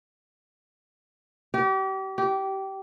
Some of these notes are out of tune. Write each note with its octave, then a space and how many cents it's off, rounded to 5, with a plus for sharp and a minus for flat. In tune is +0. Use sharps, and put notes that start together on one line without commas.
G4 -35
G4 -20